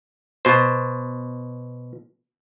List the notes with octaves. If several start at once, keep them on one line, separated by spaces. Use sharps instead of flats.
B2 C5